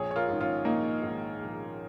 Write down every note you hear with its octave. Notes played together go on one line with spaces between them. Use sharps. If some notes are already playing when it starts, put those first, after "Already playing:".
Already playing: A#1 G#4 C#5
C#5
F4 A#4
G#2 D#3
C#4 F4
A#1 A#3 D#4
G#2 D#3
A#1